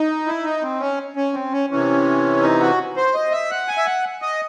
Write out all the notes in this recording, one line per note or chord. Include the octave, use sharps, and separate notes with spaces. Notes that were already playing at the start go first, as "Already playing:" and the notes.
Already playing: D#4
E4
D#4
C4
C#4
C#4
C4
C#4
C3 E3 C#4
D#4
F#4
C5
D#5
E5
F#5
G#5
E5
F#5
D#5